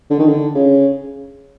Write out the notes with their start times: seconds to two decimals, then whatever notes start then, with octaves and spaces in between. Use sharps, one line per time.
0.10 D3
0.19 D#3
0.27 D3
0.55 C#3